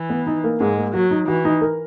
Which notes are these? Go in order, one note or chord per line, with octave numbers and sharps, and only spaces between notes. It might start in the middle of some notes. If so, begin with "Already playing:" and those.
Already playing: E3
B3
D#4
A#3
G#2 G#3
A#3
F#3 F#4
D#4
E3 F#4
D#4
A#4